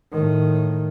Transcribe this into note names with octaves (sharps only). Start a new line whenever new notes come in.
A2 D#3